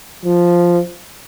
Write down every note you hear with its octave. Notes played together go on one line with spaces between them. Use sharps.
F3